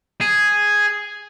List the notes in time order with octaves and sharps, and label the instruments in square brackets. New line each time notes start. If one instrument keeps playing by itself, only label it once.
[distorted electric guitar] G#4